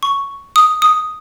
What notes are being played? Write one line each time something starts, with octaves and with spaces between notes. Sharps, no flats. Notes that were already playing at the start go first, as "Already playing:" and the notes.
C#6
D#6
D#6